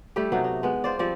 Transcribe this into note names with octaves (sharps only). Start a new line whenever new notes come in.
G3 A3 E4 G4
C3 F#3 B3 D#4
D#4
G#3 B3
F4 C5 D5
F3 G3 C4 D5